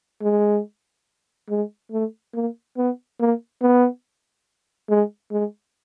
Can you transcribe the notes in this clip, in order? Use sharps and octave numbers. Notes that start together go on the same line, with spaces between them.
G#3
G#3
A3
A#3
B3
A#3
B3
G#3
G#3